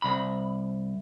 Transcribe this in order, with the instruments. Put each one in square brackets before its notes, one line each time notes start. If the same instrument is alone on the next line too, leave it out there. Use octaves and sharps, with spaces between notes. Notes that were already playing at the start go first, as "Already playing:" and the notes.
[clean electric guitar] C2 B5